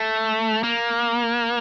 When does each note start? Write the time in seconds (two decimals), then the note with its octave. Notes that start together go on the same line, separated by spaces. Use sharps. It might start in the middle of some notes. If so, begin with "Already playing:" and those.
Already playing: A3
0.63 A#3